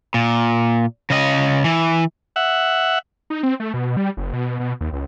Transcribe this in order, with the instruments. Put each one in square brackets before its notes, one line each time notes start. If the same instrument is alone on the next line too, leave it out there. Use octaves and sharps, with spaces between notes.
[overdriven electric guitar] A#2
C#3 D#5
E3
[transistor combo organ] E5 F#5
[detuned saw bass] D#4
C4
A3
B2
G3
F#1
B2
B2
D#2
C#2